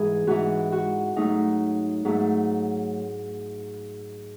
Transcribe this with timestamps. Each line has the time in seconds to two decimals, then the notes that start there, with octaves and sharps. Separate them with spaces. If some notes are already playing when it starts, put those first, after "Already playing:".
Already playing: G#2 E3 G#3 G#4
0.27 G#2 E3 G#3 F#4
0.72 F#4
1.16 G#2 F#3 A3 D#4
2.05 G#2 F#3 A3